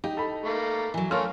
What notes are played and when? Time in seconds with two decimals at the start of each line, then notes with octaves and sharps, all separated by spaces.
0.04 D#4 G4 G5
0.17 A4 B5
0.45 A3 A#3
0.94 E3 F#3
1.11 A3 C#4 A4 A#4 C#5 F5 C6 F6